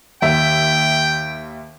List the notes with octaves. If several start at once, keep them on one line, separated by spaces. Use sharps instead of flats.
D#2 E5 G5